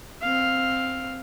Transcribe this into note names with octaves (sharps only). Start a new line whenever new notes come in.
C4 F5